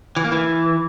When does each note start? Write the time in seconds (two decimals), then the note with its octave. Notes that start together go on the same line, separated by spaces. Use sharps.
0.16 E3
0.24 A#3
0.32 E3